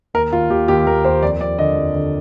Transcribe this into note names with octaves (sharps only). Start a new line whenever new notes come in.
D#2 A#4
D#2 F4
D#2 G4
D#2 G4
D#2 A#4
D#2 C5
F2 D5
F2 D5
D3 D#5
F2
D3